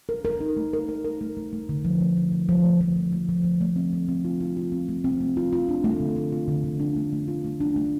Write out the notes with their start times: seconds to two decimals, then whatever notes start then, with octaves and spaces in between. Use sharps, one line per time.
0.09 A#4
0.25 A#4
0.40 D#4
0.57 A3
0.73 A#4
0.89 A#4
1.05 A#4
1.21 A3
1.37 A3
1.53 A3
1.69 D3
1.85 F3
2.01 A3
2.17 F3
2.32 F3
2.49 F3
2.64 A3
2.81 F3
2.96 F3
3.12 A3
3.29 F3
3.44 F3
3.61 A3
3.76 C4
3.93 A3
4.08 C4
4.25 F4
4.41 F4
4.57 F4
4.72 C4
4.88 A3
5.04 C4
5.20 A3
5.37 F4
5.53 F4
5.68 D4
5.84 A3
6.00 D3
6.16 A3
6.32 F4
6.48 D3
6.64 D3
6.80 D4
6.96 A3
7.13 A3
7.28 F4
7.44 A3
7.61 D4
7.76 A3